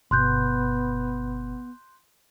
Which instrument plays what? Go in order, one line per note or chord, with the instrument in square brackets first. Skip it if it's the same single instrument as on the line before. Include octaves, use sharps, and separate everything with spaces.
[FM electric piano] G1 B2 [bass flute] B3 [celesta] C6 F#6 G6